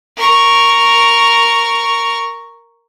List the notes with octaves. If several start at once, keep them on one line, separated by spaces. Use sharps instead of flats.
A#4 C#6